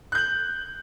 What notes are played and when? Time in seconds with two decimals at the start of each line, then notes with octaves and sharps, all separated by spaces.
0.12 F#6
0.15 G6
0.18 F#7